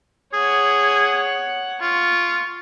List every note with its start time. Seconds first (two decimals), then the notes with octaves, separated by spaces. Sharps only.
0.34 G#4 C#5 F#5
1.82 F4 C#6